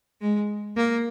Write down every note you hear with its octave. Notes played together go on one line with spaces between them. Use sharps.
G#3
A#3